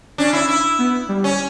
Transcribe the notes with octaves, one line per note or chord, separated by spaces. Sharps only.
C#4 D4
E4
E4
B3
G3
C#4